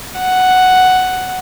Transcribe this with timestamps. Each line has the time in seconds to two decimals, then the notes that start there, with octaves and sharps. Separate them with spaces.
0.19 F#5